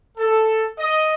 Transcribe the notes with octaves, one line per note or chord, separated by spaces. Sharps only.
A4
D#5